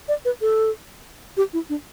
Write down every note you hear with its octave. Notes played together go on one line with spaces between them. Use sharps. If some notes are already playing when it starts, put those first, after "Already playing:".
D5
B4
A4
G4
E4
D4